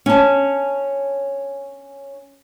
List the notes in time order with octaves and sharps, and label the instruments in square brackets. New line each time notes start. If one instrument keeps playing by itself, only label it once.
[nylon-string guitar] C#4 A5